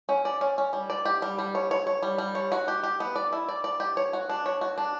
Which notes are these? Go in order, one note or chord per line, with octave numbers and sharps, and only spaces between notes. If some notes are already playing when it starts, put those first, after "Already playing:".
C#4
D5
C#4
C#4
G3
D5
G4
G3
G3
C#5
C#5
C#5
G3
G3
C#5
F#4
G4
G4
B3
D5
E4
D5
D5
G4
C#5
F#4
D4
C#5
F#4
D4